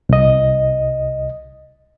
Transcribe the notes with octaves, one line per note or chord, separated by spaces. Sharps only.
C2 D#5